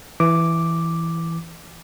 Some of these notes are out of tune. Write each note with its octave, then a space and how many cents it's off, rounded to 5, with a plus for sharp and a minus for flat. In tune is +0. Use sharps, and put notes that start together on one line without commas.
E3 +0 D6 +0